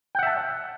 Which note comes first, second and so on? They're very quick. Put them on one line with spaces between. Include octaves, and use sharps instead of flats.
G5 F#5 E5 A5